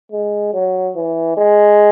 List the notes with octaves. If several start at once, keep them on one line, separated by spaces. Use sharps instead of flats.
G#3
F#3
E3
G#3